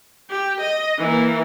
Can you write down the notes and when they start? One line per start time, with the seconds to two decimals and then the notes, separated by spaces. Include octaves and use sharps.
0.29 G4
0.61 D#5
0.98 E3 A#3